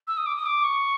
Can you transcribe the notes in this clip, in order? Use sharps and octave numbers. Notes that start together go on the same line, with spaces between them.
E6
D#6
D6
D#6
D6
C#6